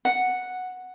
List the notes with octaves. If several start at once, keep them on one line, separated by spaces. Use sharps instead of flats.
F#5